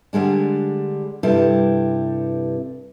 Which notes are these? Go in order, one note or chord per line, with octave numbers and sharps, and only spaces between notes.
D3 G3 G#3 D4
G2 C3 G3 E4 A4